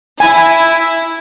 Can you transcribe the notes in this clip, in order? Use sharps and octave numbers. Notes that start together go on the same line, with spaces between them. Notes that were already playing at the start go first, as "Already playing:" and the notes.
E4 G#5